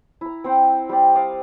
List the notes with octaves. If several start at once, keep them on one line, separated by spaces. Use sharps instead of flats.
E4 A#5
C4 C5 F#5 G5
G3 G4 D5
D5 F5 D#6